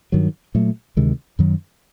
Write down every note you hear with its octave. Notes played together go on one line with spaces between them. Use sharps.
G2 D#3 F#3
A#2 F#3 A3
D2 C3 D#3 G#3
F#2 D#3 F#3